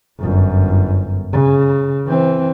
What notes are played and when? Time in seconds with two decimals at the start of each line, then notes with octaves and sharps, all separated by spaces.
0.20 G1 F#2
1.33 C#3
2.07 E3 C4